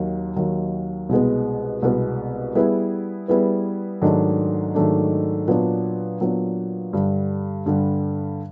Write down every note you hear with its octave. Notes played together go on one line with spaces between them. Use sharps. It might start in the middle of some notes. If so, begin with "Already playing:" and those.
Already playing: D#2 D#3 F#3
D#2 D#3 F#3
C2 B2 G#3 B3
C2 B2 G#3 B3
G3 B3 E4 G#4 B4
G3 B3 E4 G#4 B4
G#2 D#3 F#3 A3 D4
G#2 D#3 F#3 A3 D4
A#2 F#3 B3 D4
A#2 F#3 B3 D4
G2 D3 G3
G2 D3 G3